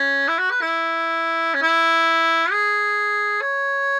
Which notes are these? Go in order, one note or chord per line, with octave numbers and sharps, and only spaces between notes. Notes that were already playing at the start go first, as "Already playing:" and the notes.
Already playing: C#4
E4
F#4
B4
E4
C#4
E4
G#4
C#5